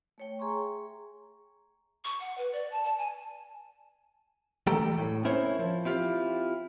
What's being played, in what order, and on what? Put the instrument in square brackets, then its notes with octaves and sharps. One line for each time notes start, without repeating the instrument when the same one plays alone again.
[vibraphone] A3 C#5 G5
G#4 E5 G#5 A#5 C6 C#6
[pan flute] C#6
F#5
B4
D5
A5
A5
G#5
[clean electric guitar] E3 G3 A3 A4 G5 A#5
A2
C4 C#4 E4 A#4 C5 C#5
F3
C4 E4 F4 G4